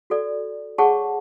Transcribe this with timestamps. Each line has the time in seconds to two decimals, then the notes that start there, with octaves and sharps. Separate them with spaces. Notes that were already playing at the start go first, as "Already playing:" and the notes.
0.10 F#4 A4 D5
0.78 G#4 C#5 F#5 A5 C#6